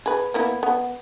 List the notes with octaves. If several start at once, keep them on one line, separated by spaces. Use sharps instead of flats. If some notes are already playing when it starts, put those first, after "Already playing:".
G#4 B4
A#3 B3 E4
B3